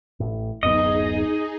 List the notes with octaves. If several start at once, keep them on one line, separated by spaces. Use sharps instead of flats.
A1 A2
D1 F#2 B3 D#4 G#4 D#5